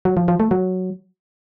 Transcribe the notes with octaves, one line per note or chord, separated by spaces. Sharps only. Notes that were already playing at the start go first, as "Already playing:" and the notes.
F#3
F3
F3
A3
F#3